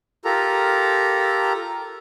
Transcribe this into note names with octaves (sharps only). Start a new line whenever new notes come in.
F4 G4 A4 A#4 A#5